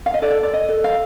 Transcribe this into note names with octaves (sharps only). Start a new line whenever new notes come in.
F5
D#5
A4 D5
D5
D#5
A4
F5